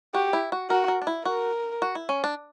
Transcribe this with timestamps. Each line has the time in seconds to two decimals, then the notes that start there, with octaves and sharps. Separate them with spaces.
0.14 F#4 G4
0.33 E4
0.52 F#4
0.70 F#4 A#4
0.88 A#4
1.02 D4
1.07 E4
1.25 F#4 A#4
1.82 F#4
1.95 E4
2.09 C#4
2.24 D4